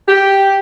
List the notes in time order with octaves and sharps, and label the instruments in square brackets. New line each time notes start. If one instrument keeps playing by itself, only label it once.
[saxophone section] G4